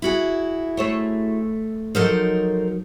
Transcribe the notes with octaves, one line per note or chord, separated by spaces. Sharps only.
E4 F#4 G#4
A3 C5 C#5
F3 F#3 D#4 A4 A#4 C5